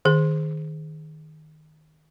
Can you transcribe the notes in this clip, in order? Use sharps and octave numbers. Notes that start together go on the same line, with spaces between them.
D#3 G#4